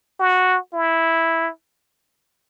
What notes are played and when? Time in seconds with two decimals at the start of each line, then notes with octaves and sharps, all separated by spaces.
0.20 F#4
0.74 E4